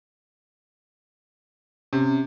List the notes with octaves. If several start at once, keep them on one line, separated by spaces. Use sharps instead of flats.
C3 C#4